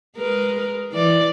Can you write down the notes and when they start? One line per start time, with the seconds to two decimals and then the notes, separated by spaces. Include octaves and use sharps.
0.17 G#3 A#4 B4
0.93 E3 D5